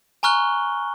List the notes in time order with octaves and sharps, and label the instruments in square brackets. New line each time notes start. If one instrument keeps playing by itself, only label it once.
[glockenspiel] G#5 A#5 C#6 F6 F#6 G7